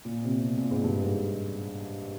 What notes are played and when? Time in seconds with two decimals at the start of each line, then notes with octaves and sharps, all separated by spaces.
0.05 A#2
0.24 C3
0.37 C3
0.44 B2
0.58 A#2
0.71 G#2
0.84 G2
1.04 G#2